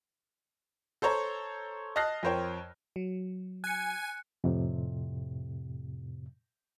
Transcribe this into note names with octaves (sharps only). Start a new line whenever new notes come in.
A4 C5 C#5 A#5
D#5 A5 F6 F#6 A#6 C7
F2 A#4 C5 C#5 G5
F#3
G#5 F#6 C#7
F2 A2 C3